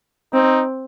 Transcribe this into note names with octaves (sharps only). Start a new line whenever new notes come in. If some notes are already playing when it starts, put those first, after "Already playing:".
C4 D#4